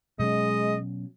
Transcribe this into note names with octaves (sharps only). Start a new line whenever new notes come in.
B2 F#3 G#3 C#4 D#5